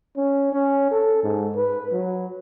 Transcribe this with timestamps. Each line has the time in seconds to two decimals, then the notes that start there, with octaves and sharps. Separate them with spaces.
0.17 C#4
0.53 C#4
0.91 A4
1.23 G#2
1.56 B4
1.93 F#3